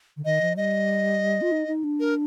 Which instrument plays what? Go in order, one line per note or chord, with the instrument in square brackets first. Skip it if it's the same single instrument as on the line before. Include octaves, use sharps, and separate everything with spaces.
[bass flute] D3
[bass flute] D#3 [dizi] D#5
[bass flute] F3
[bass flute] G3 [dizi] D#5
[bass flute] F4
D#4
D#4
D4
[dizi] A#4